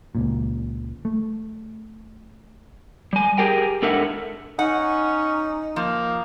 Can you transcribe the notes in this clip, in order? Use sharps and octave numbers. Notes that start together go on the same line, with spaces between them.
C#2 A#2
A3
G3 G#5
G4 G#4 A#4 G5
G#2 D4 A4 A#4 E5 F#5
C#4 D#4 F#5
F3 A#3